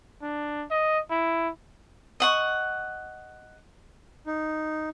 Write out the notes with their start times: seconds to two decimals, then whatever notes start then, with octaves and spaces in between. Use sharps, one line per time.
0.22 D4
0.71 D#5
1.10 E4
2.20 D#5 F#5 C#6
4.26 D#4